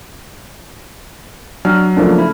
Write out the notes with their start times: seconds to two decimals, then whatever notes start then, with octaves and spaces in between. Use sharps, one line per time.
1.65 F#3 D4 F6
1.97 C#3 F3 A3 A#3 D4
2.18 E4